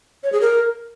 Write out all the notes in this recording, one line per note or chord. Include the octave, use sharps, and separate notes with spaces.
C#5
G#4
A#4